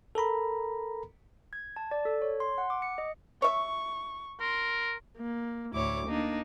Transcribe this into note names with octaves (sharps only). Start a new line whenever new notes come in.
A4 A#4 A#5 B5
G#6
A5
D5
A4
C#5
C6
F#5
D6
C#7
D#5
C#5 E5 C#6
A#4 C6
A#3
D2 A2 E4 C#5 D6
A#3 D4 D#4